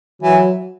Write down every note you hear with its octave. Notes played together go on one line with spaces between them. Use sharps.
E3 F#3